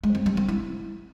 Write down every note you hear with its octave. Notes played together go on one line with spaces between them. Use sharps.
G#3
C4
G3
C4
E4